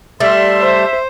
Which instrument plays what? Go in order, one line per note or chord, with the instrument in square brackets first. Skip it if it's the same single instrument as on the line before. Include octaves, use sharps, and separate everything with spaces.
[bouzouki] G3 A3 [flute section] E5 C6
[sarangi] C5